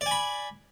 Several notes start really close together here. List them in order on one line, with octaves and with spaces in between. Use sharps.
D5 G#5 B5